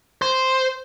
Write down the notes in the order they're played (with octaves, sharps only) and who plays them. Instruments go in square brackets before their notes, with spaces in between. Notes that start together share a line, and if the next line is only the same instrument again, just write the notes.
[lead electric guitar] C5